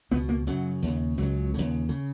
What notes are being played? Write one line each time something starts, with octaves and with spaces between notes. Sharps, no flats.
C#2 B2 B3
A#3
F#2 C#3 F#3
D#2 C#3
C#2 C#3 F#3
D#2 C#3
C#3